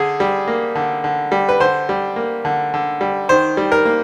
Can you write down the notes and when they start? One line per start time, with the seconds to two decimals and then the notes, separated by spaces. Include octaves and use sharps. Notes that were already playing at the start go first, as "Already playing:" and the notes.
Already playing: D3 G#4
0.20 G3
0.48 A#3
0.75 D3
1.04 D3
1.32 G3
1.49 B4
1.60 D3 C5
1.89 G3
2.16 A#3
2.45 D3
2.74 D3
3.01 G3
3.29 D#3 C5
3.57 G3
3.72 A#4
3.85 A#3